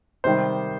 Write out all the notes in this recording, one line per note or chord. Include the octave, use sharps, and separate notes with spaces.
C3 D#3 G3 C5